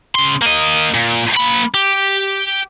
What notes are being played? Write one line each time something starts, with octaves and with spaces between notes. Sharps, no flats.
C#3 C6
A#3 D#5
A#2
A#3 B5
G4